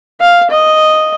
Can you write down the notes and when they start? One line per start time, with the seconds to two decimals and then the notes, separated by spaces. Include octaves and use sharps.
0.21 F5
0.51 D#5